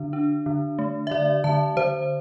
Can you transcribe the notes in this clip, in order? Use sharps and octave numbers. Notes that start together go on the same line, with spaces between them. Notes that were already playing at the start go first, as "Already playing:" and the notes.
Already playing: D3 D4
D4
D3
A3
E5
D3 D5
D3 A5
D3 C5